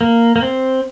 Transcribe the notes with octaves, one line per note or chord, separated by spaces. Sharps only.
A#3
A#3
C4